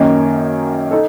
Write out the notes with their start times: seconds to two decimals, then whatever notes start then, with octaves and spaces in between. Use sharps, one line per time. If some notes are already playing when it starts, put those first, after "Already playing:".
Already playing: F#2 D#3 A#3 C#4
0.91 D#4 A4